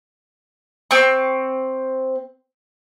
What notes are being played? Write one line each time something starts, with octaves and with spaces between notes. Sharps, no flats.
C4 C#6